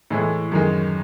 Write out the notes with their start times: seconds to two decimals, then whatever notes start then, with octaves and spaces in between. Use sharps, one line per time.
0.10 A2 E3 G#3
0.52 F#2 D#3 G#3